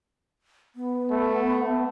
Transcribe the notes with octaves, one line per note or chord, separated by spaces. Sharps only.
B3
A3